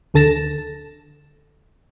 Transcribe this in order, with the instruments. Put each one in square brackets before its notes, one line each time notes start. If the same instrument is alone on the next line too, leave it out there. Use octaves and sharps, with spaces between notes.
[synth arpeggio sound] D2 D3 A4 A6 A#6 E7